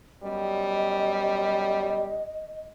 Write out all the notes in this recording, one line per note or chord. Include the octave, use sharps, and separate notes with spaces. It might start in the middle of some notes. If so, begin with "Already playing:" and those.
F#2 B2 G3 D#5